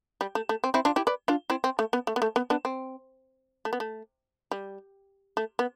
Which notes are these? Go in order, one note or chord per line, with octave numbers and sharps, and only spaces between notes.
G3
A3
A3
C4
C4 E4
D4 F4
E4 G4
B4 D5
D4 F4
C4 E4
C4
A3
B3
A3
B3
A3
B3
B3 D4
C4
A3
B3
A3
G3
A3
B3